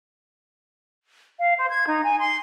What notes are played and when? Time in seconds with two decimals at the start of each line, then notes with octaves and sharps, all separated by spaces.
1.38 F5
1.57 C5
1.70 G#6
1.86 D#4
2.03 G#5
2.18 C6